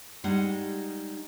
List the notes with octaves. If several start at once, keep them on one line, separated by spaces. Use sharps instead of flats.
G3 G#3 D#4 F#5